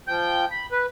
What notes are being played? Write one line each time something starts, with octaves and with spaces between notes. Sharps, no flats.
F3 G5 G6
B5
B4